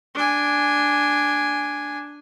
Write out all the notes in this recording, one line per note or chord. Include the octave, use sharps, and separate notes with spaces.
D4 G#5